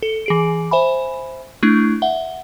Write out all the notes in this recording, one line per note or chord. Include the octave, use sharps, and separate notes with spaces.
A4
E3 G#4 D7
C5 E5 G#5 B5
A3 D4 E4
E5 F#5 G7